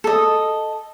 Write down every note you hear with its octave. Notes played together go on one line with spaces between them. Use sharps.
A4 D#5